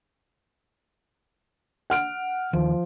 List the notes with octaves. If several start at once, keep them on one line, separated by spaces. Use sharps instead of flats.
F#5 F6 D7
D#2 F3